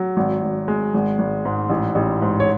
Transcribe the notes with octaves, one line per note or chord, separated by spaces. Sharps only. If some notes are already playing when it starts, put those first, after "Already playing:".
Already playing: F#3
G#1
G#1
G#3
G#1
G#1
G#2
A1
A1
G#2
C#5